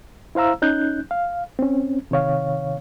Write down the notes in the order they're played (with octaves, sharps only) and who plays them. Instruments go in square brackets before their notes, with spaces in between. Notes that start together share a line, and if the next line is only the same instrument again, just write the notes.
[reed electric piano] E4 C5 F5 A#5 E6
C#4 D#4 F#6 G6
F5
C4 C#4
C3 D#3 C#5 F5